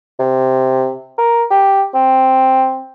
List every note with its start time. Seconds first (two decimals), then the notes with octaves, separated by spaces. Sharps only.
0.19 C3
1.18 A#4
1.50 G4
1.94 C4